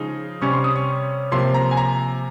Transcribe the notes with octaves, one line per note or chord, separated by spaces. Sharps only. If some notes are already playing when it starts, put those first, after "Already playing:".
Already playing: C#3 F3 G#3 D#4
C3 G3 C#4 C#6
C6
D#6
C#6
C3 F3 A#3 C6
A#5
G#5
A#5